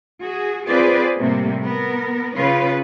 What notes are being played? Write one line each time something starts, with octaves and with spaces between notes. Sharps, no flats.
F#4 G#4
C4 F4 G#4 B4 C5 D5
A2 C3 G3 A3 A#3
B3 A#4
C#3 F4 B4 C#5